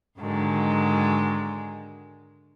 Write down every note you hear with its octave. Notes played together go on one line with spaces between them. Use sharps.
G#2 D3 D#3 F#3 G#3